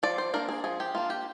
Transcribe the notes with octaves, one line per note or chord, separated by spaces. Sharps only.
F3 D5
C5
A#3 D4 A#4
G#4
F3 G#4
G4
A#3 D4 F4
G4